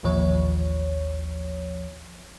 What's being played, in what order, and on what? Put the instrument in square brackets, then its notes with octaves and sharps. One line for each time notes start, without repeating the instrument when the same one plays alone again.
[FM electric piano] A1 D#2 A#2 F3 C#5